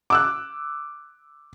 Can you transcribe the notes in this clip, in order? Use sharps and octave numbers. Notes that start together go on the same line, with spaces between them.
D6 E6 F#6